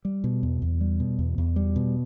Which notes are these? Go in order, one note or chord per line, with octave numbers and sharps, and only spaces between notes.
G3
B2
E2
E2
G3
B2
E2
E2
G3
B2